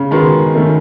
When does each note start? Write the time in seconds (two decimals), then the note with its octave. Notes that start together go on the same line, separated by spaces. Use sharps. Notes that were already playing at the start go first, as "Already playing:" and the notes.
Already playing: C#3
0.11 D#3 G#3 B3 F#4 B4
0.54 D#3 A3 C#4